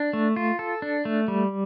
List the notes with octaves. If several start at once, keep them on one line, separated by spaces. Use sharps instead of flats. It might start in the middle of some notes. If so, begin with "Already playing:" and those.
Already playing: D4
A3
F4
A4
D4
A3
G3